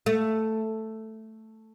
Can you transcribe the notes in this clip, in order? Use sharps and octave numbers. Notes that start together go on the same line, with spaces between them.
A3